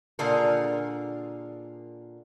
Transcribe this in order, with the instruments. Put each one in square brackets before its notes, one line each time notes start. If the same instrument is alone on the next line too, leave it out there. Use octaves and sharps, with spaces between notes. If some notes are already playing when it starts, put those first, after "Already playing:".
[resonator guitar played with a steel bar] A#2 D3 F4 G#4 A#4